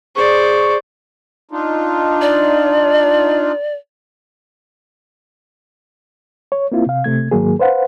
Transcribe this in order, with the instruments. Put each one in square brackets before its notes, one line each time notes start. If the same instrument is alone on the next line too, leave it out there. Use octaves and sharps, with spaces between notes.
[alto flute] G#4 [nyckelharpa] C5 D5 [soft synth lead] C#6
[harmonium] D4 D#4 F4
[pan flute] D5
[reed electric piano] C#5
A#3 C4 E4 F4
C3 F5
C3 A3 G#6
G#2 D#3 F#3 A#3 G#4
B4 C5 F5 F#5